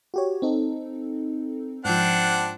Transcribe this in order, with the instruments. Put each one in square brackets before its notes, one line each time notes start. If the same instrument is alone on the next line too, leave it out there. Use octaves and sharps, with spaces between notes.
[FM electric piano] F#4 G4 C#5
C4 D#4 A4
[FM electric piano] G#2 F3 [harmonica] C4 D4 F#5